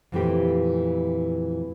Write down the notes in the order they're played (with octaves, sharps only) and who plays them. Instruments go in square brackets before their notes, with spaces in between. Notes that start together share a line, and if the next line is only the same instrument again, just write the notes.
[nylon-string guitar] F2 A#2 E3 A3 C4 G4